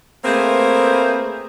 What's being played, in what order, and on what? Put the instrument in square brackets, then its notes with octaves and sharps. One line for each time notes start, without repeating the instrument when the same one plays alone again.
[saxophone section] A3 A#3 C4 G#4 B4 C5